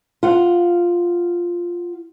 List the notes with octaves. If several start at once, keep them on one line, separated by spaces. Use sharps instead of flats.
F4 F#5